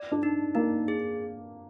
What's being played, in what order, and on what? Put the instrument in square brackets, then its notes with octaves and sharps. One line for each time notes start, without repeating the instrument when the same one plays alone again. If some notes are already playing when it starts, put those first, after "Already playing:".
Already playing: [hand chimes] D5
[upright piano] D4
[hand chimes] D#4
[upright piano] A#3 [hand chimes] D#4
[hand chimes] G#4